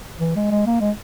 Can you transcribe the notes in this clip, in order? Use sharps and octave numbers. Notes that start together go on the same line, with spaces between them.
E3
G#3
G#3
A#3
G#3